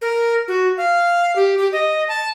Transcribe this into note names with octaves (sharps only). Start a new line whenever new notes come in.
A#4
F#4
F5
G4
G4
D#5
A5